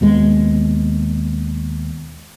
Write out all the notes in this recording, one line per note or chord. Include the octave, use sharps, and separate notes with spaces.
D#2 B2 G#3